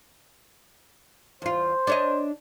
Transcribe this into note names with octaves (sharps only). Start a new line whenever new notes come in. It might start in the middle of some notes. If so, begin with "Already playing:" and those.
E2 F4 C5
D4 C#5 D#5